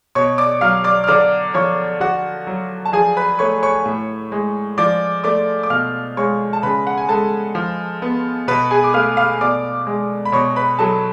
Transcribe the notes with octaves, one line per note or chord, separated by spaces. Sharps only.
B2 C#5 C#6
D5 D6
F#3 F5 F6
D5 D6
F6
D3 D5 D6
F3 C#5 C#6
D3 F#4 F#5
F#3
A5
F3 G#4 G#5
B4 B5
A3 C#5 C#6
C#5 C#6
A2
G#3
F3 D5 D6
A3 D5 D6
D6
B2 F5 F6
G#3 C#5 C#6
A5
C#3 B4 B5
F#5
G#5
G#3 A4 A5
F3
B3
B2 B4 B5
G#4 G#5
D6
A3 F5 F6
F5 F6
B2 D5 D6
G#3
B5
B2 C#5 C#6
B4 B5
F#3 A4 A5